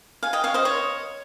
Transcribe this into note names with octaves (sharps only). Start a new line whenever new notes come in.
F5 G#5
D#5 G5
C#5 F5
C5 D#5
C#5